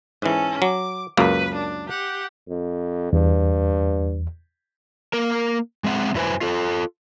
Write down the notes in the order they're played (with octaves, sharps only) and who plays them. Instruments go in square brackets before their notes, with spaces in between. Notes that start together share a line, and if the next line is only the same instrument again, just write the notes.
[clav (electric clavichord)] G#2 E3 [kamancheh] C#4 A4
[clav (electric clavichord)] F#3 [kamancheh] D6
[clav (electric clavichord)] C#2 F#2 A#3 [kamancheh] B4
[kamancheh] D4
G4 F#5
[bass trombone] F2
[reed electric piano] E2 [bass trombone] G2
[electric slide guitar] A#3 A#4
G#3 C4 E5 F#5
F#2 F#3 E4 B4 C5 G#5
F4 A4